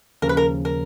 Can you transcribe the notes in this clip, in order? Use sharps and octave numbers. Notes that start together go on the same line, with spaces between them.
D#2 C#3 F3 A#4
B4
A#4
A#4